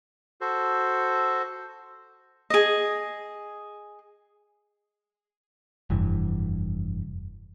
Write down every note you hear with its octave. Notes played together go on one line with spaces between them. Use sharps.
F#4 A4 C5
G#4 D#5
F1 G2 E3